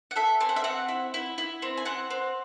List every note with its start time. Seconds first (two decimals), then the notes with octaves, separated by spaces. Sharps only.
0.11 F#5
0.16 A4 E5
0.40 C4 G#5
0.49 F#5
0.56 E5
0.64 C4 F#5
0.88 E4
1.14 E4
1.38 E4
1.62 C4
1.77 G#5
1.85 C4 F#5
2.11 C4